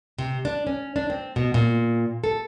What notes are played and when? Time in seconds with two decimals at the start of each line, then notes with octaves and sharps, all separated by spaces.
0.18 C3
0.45 D4
0.67 C#4
0.96 D4
1.10 C4
1.36 B2
1.54 A#2
2.24 A4